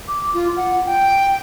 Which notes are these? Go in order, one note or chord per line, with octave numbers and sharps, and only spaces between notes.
D6
F4
F#5
G5